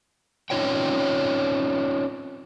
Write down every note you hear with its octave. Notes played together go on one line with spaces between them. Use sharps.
C4 C#4 D#4 F4 C#5 G5